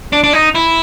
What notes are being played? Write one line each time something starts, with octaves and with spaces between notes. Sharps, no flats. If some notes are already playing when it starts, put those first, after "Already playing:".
D4
D4
D#4
E4